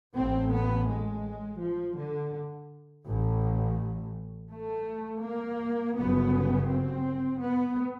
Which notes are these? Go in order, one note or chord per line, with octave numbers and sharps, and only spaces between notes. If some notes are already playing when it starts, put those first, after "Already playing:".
A1 A2 C4
B3
G#3
F3
D3
A1 A2
A3
A#3
G1 F#2 C#3 B3
C4
B3